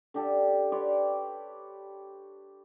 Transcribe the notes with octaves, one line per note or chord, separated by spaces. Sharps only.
D3 G4 A4
B4 C#5 D5 C6